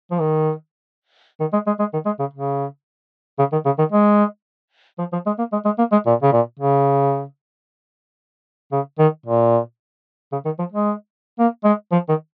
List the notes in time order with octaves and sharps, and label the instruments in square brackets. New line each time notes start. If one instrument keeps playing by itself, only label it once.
[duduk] F3
D#3
D#3
G#3
G#3
G#3
D#3
G#3
C#3
C#3
C#3
D#3
C#3
D#3
G#3
F3
F3
G#3
A#3
G#3
G#3
A#3
G#3
A#2
C#3
A#2
C#3
C#3
D#3
A#2
C#3
D#3
F3
G#3
A#3
G#3
F3
D#3